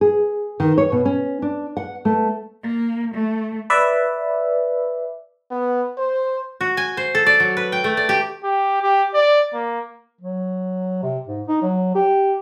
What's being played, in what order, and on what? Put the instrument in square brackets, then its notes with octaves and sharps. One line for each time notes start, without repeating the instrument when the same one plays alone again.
[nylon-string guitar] G#4
D#3
C#5
B2
C#4
D4
F#5
A3
[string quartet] A#3
A3
[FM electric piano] B4 D5 E5
[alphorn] B3
C5
[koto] F#4
G#5
C5
A4
D5
F#3
B4
G5
A3
D5
G4
[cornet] G4
G4
D5
A#3
[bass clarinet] F#3
C3
G#2
D#4
F#3
G4